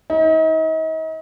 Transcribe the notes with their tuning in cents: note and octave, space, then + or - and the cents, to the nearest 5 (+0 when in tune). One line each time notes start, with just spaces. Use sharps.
D#4 +40